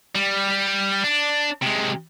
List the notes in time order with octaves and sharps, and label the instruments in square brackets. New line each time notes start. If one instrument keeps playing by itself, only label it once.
[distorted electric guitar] G3
D4
C3 G#3